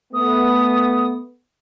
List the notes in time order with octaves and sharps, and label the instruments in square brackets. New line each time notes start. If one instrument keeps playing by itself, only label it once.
[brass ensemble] A3 B3 [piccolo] D#6